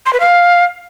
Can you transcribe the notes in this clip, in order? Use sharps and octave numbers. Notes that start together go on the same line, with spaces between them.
C6
B4
F5